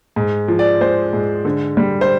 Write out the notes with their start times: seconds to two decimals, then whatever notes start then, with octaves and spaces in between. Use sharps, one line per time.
0.16 G#2
0.48 F3
0.59 D5
0.81 G#3 C5
1.13 G#2
1.45 D3
1.77 G3
2.01 C5